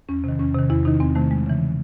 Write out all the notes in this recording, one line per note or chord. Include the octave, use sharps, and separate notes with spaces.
E2 C#4
C3 D#3
E2 C#4
C3 D#3
E2 E4
C3 D#3 D#4
E2 C4
C3 D#3 A3
E2 G#3
C#3 E3